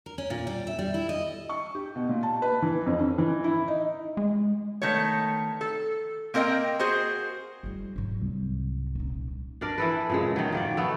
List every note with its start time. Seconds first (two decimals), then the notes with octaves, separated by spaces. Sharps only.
0.06 A#4
0.18 C#4
0.30 A#2
0.47 G3
0.67 E5
0.79 G3
0.94 E4
1.09 D#5
1.49 C#6
1.75 G4
1.96 B2
2.09 A#2
2.23 A5
2.42 B4
2.62 E3
2.86 F2
2.99 C#4
3.18 E3
3.44 E4
3.68 D#4
4.17 G#3
4.82 D#3 A3 B3 C#5
5.61 A4
6.34 A#3 C4 A#4 D#5 G5
6.79 F#4 G#4 C5
7.63 G3 E4
7.96 G#2 F#3
8.22 C2
8.95 D#1 D#4
9.61 D4 A#4 D5
9.78 E3 A4 B4
10.10 A#2 C#3 G#3
10.36 D#3 F#3
10.52 D#3 A#3 D5
10.77 A3 B3 F#4